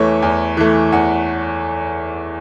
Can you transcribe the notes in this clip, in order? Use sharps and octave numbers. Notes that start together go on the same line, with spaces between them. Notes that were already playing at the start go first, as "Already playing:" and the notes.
Already playing: E2 E3 A3 B4 C#5
E2
E3 A3
E2 F#5